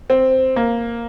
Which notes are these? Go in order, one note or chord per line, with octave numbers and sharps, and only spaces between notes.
C4
A#3